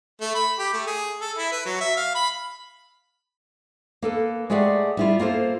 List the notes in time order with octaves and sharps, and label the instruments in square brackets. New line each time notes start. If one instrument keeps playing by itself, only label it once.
[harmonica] A3
B5
G4
A3
G#4
A4
E4
B4
F#3
E5
F5
B5
[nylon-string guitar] A#3 A4 B4
G#3 A3 G4 G#4 D5 F#5
G3 E4 F4
A#3 F4 A4 C5